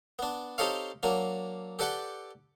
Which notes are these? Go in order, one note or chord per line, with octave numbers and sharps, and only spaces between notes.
B3 D4
C4 D#4 G4 A4 C#5 F5
F#3 A#3 D4
G4 A4 B4 D5 F#5 G5